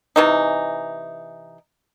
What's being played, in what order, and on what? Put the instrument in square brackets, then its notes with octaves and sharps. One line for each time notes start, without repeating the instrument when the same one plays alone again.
[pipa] C3 E3 D#4